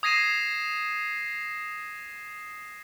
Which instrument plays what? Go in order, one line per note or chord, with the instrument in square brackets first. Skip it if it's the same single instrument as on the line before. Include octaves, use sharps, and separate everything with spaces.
[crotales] D#6 G#6 A#6 C7 D#7 E7